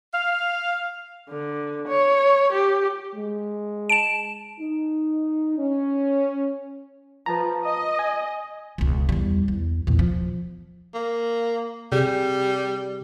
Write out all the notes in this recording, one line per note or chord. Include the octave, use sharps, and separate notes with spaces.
F5
D3
C#5
G4
G#3
A5 D7 E7
D#4
C#4
F3 B4 A5 A#5
D#5
G#5
E1 C#2
E2 G3
E2
E2 A#2
F3
A#3
C3 G3 G#4